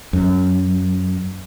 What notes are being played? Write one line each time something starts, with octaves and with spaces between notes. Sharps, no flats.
F#2